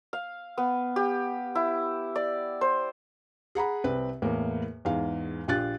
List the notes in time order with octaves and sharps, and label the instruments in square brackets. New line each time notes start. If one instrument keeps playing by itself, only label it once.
[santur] F5
B3
G4
E4
D5
C5
[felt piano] G#4 F#5 A#5 B5
C2 C4 B4
E2 A2 A#3
E2 G#2 F5
A#1 F4 G4 F#6 A6